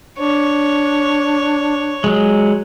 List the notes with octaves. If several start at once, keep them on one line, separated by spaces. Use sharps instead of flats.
D4 C#5
F#3 G#3